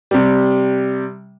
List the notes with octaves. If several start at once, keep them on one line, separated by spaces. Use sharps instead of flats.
C3 G3